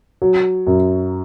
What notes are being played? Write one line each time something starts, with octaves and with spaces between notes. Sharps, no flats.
F#3
F#2